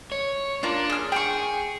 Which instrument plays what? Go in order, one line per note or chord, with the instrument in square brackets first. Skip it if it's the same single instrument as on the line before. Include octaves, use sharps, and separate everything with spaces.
[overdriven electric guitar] C#5
[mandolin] A#3 F4 [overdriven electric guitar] D4
[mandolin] G#4 F6
[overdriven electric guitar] G#4 [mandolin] G5 C#6